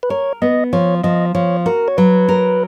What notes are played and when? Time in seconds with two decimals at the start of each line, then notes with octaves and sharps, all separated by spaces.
0.03 B4
0.10 A#4 C#5
0.42 B3 D#5
0.73 F3 C#5
1.04 F3 D#5
1.35 F3 C#5
1.66 F#4 A#4
1.88 C#5
1.98 F#3 B4
2.29 A#4